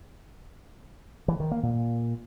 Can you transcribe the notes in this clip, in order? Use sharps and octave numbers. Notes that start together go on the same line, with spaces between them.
E3
D#3
A#3
A#2